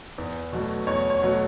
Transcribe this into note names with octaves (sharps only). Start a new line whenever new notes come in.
E2
B2 F#3 A3
E2 C#5
C#5
B2 F#3 A3